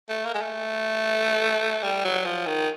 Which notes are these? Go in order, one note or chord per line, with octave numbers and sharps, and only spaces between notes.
A3
A#3
G#3
A3
G3
F#3
F3
D#3